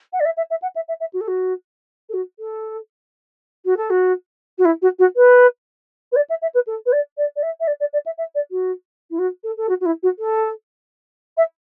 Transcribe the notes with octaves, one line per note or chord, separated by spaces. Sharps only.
F#5
D5
E5
E5
E5
F#5
E5
E5
E5
F#4
A4
F#4
A4
F#4
A4
F#4
A4
F#4
F#4
E4
F#4
F#4
B4
B4
D5
E5
E5
B4
A4
B4
D5
D5
D5
E5
E5
D5
D5
D5
E5
E5
D5
F#4
E4
F#4
A4
A4
F#4
F#4
E4
F#4
A4
E5